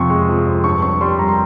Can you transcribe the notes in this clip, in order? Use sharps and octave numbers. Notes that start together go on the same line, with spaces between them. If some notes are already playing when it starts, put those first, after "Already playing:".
Already playing: F2 C3 F3 C6 C#6
G#3
F3
F2
G2 C#6
G2 C#6
G3 C6
G3 A#5
C6